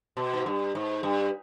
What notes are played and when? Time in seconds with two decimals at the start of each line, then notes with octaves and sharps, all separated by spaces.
0.17 B2
0.33 G#2
0.46 G2
0.75 G#2
1.03 G2